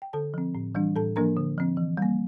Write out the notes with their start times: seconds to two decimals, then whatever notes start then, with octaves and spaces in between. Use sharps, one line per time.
0.02 G5
0.13 D3 A4 A5
0.34 F3 C4
0.55 A2
0.75 E3 G3 D4
0.96 A2 A4 A5
1.16 F3 A#3 D4 A#4 A#5
1.37 D3
1.58 F3 C4
1.77 E3
1.97 G3 A#3